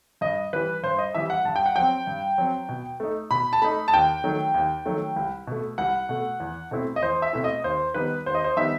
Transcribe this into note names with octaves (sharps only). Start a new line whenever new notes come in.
G2 D#5
E3 G3 B4
G2 C5
D#5
E3 G3 E5
F#5
G2 A5
G5
F#5
F#3 C4 G5
G2
F#3 C4
B2
A3 D#4
B2 B5
A5
A3 D#4 B5
A5
D#2 G5
D#3 F#3 A3
D#2
D#3 F#3 A3
C2
B2 A3
C2 F#5
B2 A3
E2
B2 A3 C4 E4
D#5
E2 C5
E5
B2 A3 C4 E4
D#5
D#2 C5
D#3 G3 B3 D#4 B4
D#2 C5
D#5
C5
D#3 G3 B3 D#4 E5